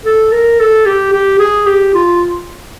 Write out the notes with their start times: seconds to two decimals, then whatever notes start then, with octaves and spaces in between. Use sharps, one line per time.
0.06 A4
0.32 A#4
0.60 A4
0.86 G4
1.13 G4
1.39 G#4
1.67 G4
1.94 F4